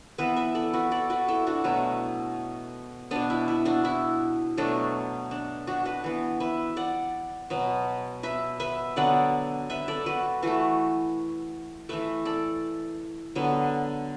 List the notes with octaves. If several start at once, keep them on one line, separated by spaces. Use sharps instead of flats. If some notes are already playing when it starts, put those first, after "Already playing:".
E3 B3 B4 E5
B4 E5
A4 D5
F#4 B4
A4 D5
F#4 B4
E4 A4
D4 F#4
B2 F#3 A3 E4
B2 B3 D4
E4
E4
D4 F#4
E4
B2 F#3 A3 D4
D4
D4 F#4
F#4 B4
E3 B3
B4 E5
D5 F#5
B2 F#3 B3
B4 E5
B4 E5
D3 F#3 B3 D5 F#5
B4 E5
A4 D5
F#4 B4
E3 A3 F#4 B4
E3 A3 B4 E5
A4 D5
D3 F#3 B3